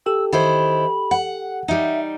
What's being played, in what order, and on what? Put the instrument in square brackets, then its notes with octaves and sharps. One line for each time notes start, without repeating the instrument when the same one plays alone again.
[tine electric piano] G4 A4 G5 [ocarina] E6
[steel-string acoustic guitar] D#3 E4 C5 [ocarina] B5
[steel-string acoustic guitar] F#5
[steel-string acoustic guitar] G3 D#4 [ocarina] E5